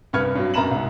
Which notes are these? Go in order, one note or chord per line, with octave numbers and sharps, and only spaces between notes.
C2 G2 B4 F6 G#6 C#7
G2 F#3
F#2 B2 A#5 B5 E7 F#7
C2 G#2